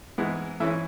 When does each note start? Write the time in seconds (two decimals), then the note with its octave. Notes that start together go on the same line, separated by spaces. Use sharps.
0.18 G#2 E3 G#3 B3 E4
0.60 G#2 E3 C#4 E4 E5